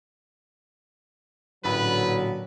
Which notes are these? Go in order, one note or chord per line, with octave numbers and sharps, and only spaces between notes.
A1 A#2 D3 F#3 B4 B5